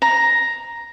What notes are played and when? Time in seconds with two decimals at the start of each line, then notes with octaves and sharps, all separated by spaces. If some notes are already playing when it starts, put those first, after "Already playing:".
0.02 A#5